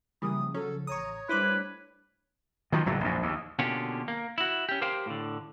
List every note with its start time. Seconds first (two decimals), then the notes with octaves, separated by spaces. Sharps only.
0.22 C#3 E3 F3 G3 A#3 D#6
0.54 F#3 C#4 A4
0.87 A1 C#5 A#5 C#6 D#6
1.29 G3 A3 D4 E4 B4 C5 D6
2.72 D#3 F3 F#3
2.86 F#1 A2 F#3
3.01 A#1 F#2
3.22 D#2
3.59 B2 D3 A#3 C#4 F4 G4
4.08 A#3
4.38 E4 F#4
4.69 C#4 G4
4.82 G4 A#4 C5 F5 G5
5.06 A2 D3